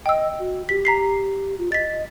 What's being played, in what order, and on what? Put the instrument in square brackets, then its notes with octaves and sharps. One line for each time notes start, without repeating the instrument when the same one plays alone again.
[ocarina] D#5 [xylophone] G5 E6
[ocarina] F#4
[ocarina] G4 [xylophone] B6
[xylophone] A#5 B6 C7
[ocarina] F4
[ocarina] D#5 [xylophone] A6 B6